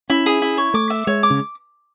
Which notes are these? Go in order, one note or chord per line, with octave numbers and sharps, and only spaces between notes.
C#4 E4
G#4
E4
C#5
A3 D6
E5
G#3 C#5
D6
C#3